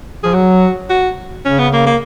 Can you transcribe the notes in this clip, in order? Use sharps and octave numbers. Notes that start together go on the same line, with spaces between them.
F3 G#4
F#3 F#4
F#4
C#3 C#4
B3
A#3
A#3